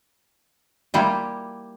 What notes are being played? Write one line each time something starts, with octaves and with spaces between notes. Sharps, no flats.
G3 A#3 E4 F4 G4